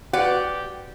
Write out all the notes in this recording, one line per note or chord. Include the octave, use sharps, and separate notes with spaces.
F#4 G4 B4 D5 F#5